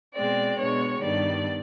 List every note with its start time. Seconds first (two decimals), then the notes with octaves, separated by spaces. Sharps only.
0.14 B2 G#3 C4 D5
0.58 B2 G#3 B3 D4 C#5
1.01 G2 D#3 G3 B3 D4 D5